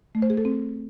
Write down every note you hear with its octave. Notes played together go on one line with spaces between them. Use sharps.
A3
C5
G#4
A4
C4